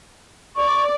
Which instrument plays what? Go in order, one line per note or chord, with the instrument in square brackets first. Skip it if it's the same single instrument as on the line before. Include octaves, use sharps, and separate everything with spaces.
[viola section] D5 [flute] C#6